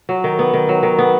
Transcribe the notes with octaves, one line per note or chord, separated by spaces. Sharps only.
F#3
D#3
B3
D#3
F#3
D#3
B3